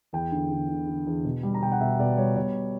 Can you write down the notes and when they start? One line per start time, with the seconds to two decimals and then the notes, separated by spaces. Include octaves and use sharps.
0.13 E2 G5
0.32 D3
0.51 D3
0.69 D3
0.87 D3
1.07 E2
1.25 B2
1.43 G3
1.54 A#5
1.62 B2 G5
1.72 F#5
1.80 B2 E5
1.99 B2 D5
2.17 G3 C#5
2.36 B2 C#5